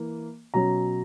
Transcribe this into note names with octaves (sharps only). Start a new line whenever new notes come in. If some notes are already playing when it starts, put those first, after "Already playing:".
Already playing: E3 A#3
B2 F#3 C#4 A#5